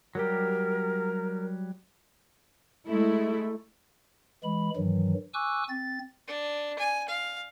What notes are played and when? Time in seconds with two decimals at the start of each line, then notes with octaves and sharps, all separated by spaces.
0.15 F#3 G3 G4 A#4
2.89 G#3 A3 E4
4.44 E3 G#3 B5
4.76 G2 D#3 E3 F#3
5.34 G#5 C#6 D6 E6 F#6
5.69 C4 A6
6.28 D4
6.79 G#5
7.08 F5